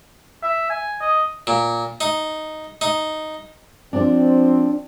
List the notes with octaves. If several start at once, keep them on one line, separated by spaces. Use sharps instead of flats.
E5
G#5
D#5
A#2
D#4
D#4
F3 C4 D4 D5